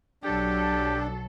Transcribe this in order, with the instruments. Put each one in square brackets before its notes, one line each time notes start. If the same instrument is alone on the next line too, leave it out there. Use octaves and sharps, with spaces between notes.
[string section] B1 F#3 A4 [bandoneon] D4 [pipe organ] G4